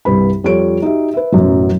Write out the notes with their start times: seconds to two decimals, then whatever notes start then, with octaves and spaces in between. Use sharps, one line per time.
0.05 C2 G2 B4 B5
0.44 F2 G3 F4 A4 C#5 D7
0.82 D#4 F#4 G4 E5
1.14 B4 E5
1.32 A1 F#2 B2 F#3